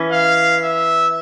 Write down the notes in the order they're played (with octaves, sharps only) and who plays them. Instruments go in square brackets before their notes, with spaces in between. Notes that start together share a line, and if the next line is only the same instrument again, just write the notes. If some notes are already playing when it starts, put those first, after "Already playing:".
Already playing: [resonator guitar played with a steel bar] E3 C#4
[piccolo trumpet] F5
E5